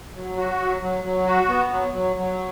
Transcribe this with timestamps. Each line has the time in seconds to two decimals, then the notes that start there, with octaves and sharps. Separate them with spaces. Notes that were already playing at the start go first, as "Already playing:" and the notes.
0.15 F#3
0.37 F#4
0.59 F#3
0.81 F#3
1.04 F#3
1.27 F#4
1.49 B3
1.71 F#3
1.93 F#3
2.16 F#3